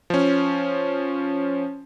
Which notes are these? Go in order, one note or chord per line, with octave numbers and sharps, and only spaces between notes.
F3 C#4